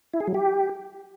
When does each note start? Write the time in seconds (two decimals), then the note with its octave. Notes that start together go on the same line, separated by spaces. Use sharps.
0.13 E4
0.20 G#4
0.27 F#3
0.34 G4